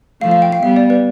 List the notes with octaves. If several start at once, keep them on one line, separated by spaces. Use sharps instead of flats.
F3 A3 F5
F5
G5
F5
G3 B3 E5
D5
B4